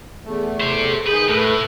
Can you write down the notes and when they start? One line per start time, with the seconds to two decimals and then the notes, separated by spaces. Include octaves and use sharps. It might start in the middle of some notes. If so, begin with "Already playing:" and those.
0.25 E2 A3
0.61 G4 C5
1.07 D#3 G#4 B4 G6
1.28 A2 A3 B4